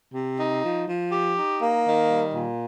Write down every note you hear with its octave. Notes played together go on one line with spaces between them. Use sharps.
C3
D#4
F3
F3
G4
D#4
A#3
D#3
G3
A#2